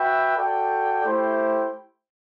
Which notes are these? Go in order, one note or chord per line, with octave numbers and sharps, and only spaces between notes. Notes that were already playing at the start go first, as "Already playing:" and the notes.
Already playing: F#4 B4 E5 G5
F#4 A4 D5 G5
A3 E4 G4 C5 G5